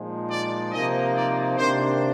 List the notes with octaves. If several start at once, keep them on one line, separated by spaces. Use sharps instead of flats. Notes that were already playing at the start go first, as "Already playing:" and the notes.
Already playing: A#2 F3 G#3 D#4
D5
C3 F3 A#3 D#4 D#5
D5
C3 D#3 A#3 D4 C5